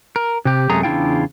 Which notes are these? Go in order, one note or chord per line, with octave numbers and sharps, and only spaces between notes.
A#4
C3 G4
F#2 C3 G#3 A3 G#4 A#5
E2 C#3 D4 E4 F4 G5